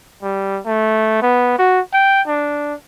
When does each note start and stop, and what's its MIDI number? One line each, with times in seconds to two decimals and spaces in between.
0.23 0.60 55
0.66 1.18 57
1.22 1.54 59
1.58 1.80 66
1.93 2.22 79
2.27 2.74 62